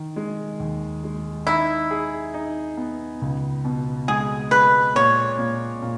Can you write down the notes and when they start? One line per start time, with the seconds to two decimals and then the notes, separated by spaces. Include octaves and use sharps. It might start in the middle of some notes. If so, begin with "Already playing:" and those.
Already playing: D#3
0.16 G#3
0.60 D#2
1.04 G#3
1.47 D#4 E4
1.91 G#4
2.34 D#4
2.77 B3
3.22 C#2
3.65 B2
4.08 G#3 G#4
4.51 G#3 B4
4.95 A#2 C#5
5.39 A#2
5.82 A#2